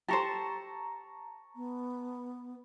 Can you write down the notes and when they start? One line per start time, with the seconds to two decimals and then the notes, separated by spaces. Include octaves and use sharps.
0.08 G4 A4 C5 A5 A#5 C#6
1.56 B3